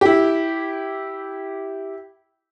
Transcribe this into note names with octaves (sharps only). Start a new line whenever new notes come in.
E4 G4